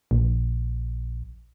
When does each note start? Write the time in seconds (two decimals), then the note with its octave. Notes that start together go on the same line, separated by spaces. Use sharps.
0.11 A#1